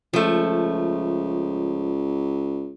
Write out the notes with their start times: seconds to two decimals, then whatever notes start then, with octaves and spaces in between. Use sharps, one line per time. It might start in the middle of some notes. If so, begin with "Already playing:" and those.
0.13 C#2 F3 A3